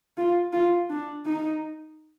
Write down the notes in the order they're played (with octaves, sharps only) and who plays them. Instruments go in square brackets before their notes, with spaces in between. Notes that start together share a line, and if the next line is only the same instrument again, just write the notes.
[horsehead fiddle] F4
F4
D4
D#4